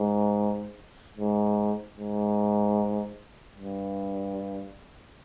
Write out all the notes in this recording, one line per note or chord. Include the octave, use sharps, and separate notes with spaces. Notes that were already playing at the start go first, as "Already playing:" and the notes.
Already playing: G#2
G#2
G#2
G2